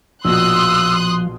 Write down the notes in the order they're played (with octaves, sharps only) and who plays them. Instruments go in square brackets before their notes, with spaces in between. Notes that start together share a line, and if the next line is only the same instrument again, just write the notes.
[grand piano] A#1 B2 [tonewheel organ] F3 [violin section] C6 D#6 F#6 [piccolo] E6